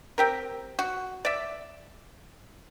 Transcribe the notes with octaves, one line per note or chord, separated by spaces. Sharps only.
C4 G4 A#4
F#4
D5 E5